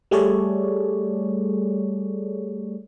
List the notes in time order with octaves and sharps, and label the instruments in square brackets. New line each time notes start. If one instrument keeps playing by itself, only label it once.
[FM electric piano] G3 A3 G#4 A4 C#5 D5